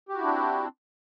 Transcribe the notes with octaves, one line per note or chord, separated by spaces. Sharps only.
C4 D4 E4 F#4 G4